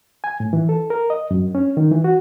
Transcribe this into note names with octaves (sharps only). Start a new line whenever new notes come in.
G#5
A2
E3
A4
A#4
D#5
F#2
C#4
D#3
E3
F#4